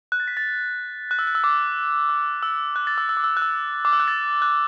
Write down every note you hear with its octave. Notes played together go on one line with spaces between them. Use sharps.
F#6
A6
B6
A6
F#6
E6
F#6
E6
D6
E6
E6
F#6
A6
E6
E6
D6
E6
F#6
E6
D6
E6
F#6
A6
F#6